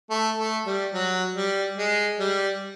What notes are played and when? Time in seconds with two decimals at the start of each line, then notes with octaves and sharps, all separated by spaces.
0.10 A3
0.38 A3
0.66 G3
0.94 F#3
1.36 G3
1.78 G#3
2.19 G3